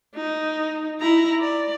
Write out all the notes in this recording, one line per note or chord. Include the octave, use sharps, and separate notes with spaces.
D#4
E4 A#5
D5